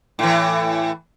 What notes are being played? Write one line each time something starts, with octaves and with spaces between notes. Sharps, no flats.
A2 E3